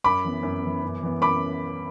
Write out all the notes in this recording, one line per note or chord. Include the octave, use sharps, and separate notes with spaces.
F#2 B5 D6
E3 B3
F#2
E3 B3
F#2
E3 B3
F#2 B5 D6